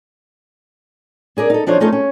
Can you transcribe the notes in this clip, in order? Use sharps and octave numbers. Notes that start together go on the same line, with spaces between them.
D4 G#4 A#4 D5
D#4 A4
F3 D4 D#4 C5 C#5
A3 C#4 D#4 F4 G#4 A4
C#4